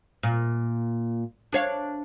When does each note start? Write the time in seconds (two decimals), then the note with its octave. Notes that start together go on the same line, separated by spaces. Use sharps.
0.23 A#2
1.53 D4 C#5 F5